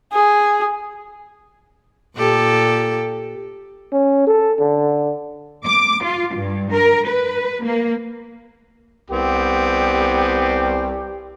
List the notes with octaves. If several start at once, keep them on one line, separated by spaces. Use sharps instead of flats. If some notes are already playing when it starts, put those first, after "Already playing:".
G#4
A#2 G4 A4
C#4
A4
D3
D6
F4
G2
A#4
B4
A#3
C2 B3 C4 G4